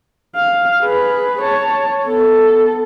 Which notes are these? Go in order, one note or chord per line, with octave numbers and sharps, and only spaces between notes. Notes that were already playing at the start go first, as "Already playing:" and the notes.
F5
G#4 B4
C#5 A5
B3 A4